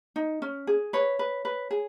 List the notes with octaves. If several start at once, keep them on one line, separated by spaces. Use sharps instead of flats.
D#4
C#4
G#4
B4 C#5
B4
B4
G#4